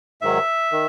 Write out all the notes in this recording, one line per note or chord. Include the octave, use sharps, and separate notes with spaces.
G#2 D#3 F#3 E5
D#3